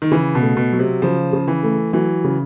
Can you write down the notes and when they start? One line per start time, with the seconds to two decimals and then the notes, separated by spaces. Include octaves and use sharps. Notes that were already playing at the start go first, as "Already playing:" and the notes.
0.02 D#3
0.11 C#3 E3
0.35 B2
0.41 A3
0.56 B2
0.73 F#3
0.79 C3
1.02 C#3 F3
1.33 C#3
1.48 E3
1.63 A3
1.93 E3 F#3
2.24 C#3